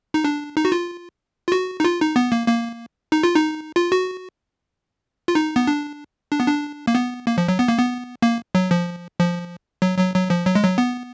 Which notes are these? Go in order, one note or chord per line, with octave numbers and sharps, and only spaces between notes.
D#4
D4
D#4
F#4
F4
F4
F#4
D#4
F4
D#4
B3
A#3
A#3
D#4
F4
D#4
F4
F#4
F4
D#4
B3
D4
D4
B3
D4
A#3
B3
A#3
F3
F#3
B3
A#3
B3
A#3
F#3
F3
F3
F#3
F#3
F#3
F3
F#3
G#3
F#3
B3